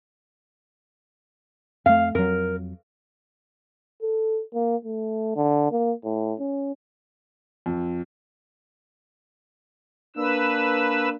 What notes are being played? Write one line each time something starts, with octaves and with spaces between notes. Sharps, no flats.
F2 A3 F5
F2 F#3 A#4
A4
A#3
A3
D3
A#3
A2
C#4
F2
A#3 D4 B4 E6